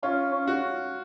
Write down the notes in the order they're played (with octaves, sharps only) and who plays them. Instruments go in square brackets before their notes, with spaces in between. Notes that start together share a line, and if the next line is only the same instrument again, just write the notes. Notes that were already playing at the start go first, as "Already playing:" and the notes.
[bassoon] C#4 [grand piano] F4
[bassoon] C#4
[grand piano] F#4